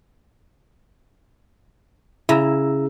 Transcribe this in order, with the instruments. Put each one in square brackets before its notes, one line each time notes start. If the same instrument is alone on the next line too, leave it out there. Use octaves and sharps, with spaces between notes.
[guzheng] C#3 [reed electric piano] E4 A#5 E6